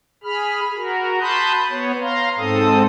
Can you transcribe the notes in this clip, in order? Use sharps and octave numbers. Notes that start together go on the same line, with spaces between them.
G#4 B5 F6
F#4 A#4
A5 B5 C6 D#6 F#6 G6
B3 C#5
F5 A#5 C6
G#2 C4 A4 D#6